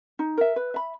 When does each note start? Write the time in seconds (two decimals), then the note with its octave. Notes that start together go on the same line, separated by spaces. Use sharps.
0.19 D#4
0.38 A#4 E5
0.56 B4
0.74 E5 B5